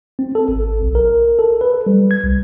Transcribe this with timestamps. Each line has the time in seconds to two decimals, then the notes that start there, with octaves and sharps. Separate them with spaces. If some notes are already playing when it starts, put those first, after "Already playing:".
0.19 C4
0.35 A4
0.48 G#1
0.82 B1
0.95 A#4
1.39 A4
1.61 B4
1.86 G3
2.11 G#6
2.24 C2